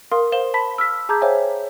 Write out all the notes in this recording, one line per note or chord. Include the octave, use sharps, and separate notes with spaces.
A#4 F5 C6 D#6
C5 F5 E7 G7
A5 B5 B6
E6 F6 B6
G#4 A5 A#5 D6 G6 G#6
C5 C#5 E5 F5 G5 G#5